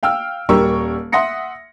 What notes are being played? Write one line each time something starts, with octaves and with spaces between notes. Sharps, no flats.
F5 G5 E6 F6
D#1 G3 G4 A#4 C#6 E6
E5 F#5 C6 D#6 A#6 C#7